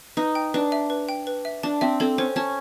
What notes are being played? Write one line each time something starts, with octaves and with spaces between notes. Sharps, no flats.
D#4 B4
G5
D4 B4
E5
B4
G5
B4
E5
D4 A5
C4 E5
C4 A4
C#4 C5
C#4 A5